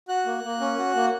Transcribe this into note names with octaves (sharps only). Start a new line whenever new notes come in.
F#4 F#6
A#3
A#3
C#4
F#4
A#3